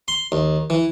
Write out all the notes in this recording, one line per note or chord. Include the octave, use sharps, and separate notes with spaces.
C6
D#2
E3